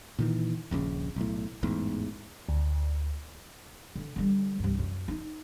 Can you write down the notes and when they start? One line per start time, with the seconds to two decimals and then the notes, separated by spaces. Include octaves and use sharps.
0.19 A#2 D#3 E3
0.71 D#1 A#1 G#2 C#3
1.16 B1 A2
1.63 A1 E2 G#2
2.49 D2
3.96 D3
4.16 D3 G3
4.59 C2 G2
4.79 F#2
5.08 D#4